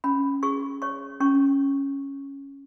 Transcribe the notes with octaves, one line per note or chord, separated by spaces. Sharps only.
C#4 B5
G#4 C#6
C#5 C#6
C#4 C#6